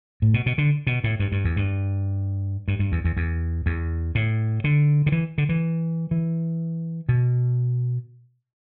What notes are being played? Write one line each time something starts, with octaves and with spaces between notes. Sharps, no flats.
A2
B2
B2
D3
B2
A2
G2
G2
E2
G2
G2
G2
E2
E2
E2
E2
A2
D3
D3
E3
D3
E3
E3
B2